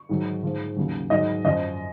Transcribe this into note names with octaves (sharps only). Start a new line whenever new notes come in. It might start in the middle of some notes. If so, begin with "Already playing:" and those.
Already playing: C#6
G#2 D#3 F#3
G#2 F3
D#2 C#3 F#3
G#2 D#3 F#3 D#5
F#2 F3 D#5